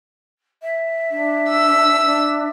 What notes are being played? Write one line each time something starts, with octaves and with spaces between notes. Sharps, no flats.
E5
D4
E6
D4